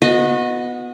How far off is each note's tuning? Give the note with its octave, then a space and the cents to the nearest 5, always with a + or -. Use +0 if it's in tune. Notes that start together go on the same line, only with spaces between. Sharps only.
B3 +0 F#4 -30 D#5 +0